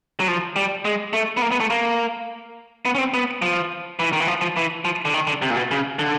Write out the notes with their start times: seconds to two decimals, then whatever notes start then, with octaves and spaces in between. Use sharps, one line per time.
0.20 F#3
0.28 F3
0.56 G3
0.85 G#3
1.13 A3
1.37 B3
1.42 A#3
1.51 B3
1.60 A3
1.71 A#3
2.85 B3
2.95 C#4
2.98 C4
3.14 B3
3.42 F3
3.99 E3
4.13 D#3
4.20 E3
4.27 F3
4.41 F3
4.57 E3
4.85 F3
5.05 D3
5.14 D#3
5.27 D3
5.42 C3
5.50 A#2
5.56 B2
5.71 C#3
5.99 D3